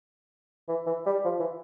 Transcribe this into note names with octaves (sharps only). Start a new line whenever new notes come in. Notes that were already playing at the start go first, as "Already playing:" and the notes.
E3
E3
G3
F3
E3